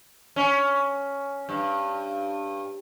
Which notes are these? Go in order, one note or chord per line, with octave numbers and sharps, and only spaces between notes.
C#4
G2